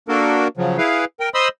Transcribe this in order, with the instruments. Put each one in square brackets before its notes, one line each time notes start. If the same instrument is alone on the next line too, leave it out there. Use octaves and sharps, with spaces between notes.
[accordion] A#3 D4 F#4 A4 A#4
C#3 F3 F#3
E4 G#4 B4 F5
A#4 G5
C5 D#5 B5 C6 D#6 E6